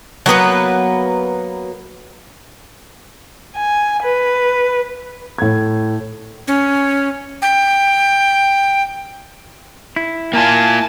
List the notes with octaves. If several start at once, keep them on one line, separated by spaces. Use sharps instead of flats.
F#3 A#3 B3 B4
G#5
B4
A2 G#6
C#4
G5
E4
A#3 F4 G#5 A5